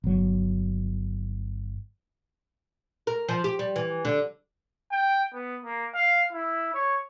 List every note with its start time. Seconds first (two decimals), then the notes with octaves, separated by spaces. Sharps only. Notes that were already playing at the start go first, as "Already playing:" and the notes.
0.04 G1 F#3
3.07 A#4
3.29 F3
3.44 G4
3.59 G3
3.76 E3
4.05 D3
4.91 G5
5.34 B3
5.65 A#3
5.94 F5
6.33 E4
6.74 C#5